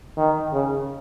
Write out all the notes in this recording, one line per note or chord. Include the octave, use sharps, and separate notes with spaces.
D#3
C#3